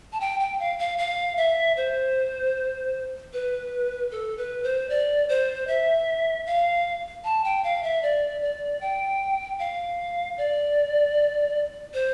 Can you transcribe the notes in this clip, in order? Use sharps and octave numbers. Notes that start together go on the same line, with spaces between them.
A5
G5
G5
F5
F5
F5
E5
C5
B4
A4
B4
C5
D5
C5
E5
F5
A5
G5
F5
E5
D5
D5
G5
F5
D5
C5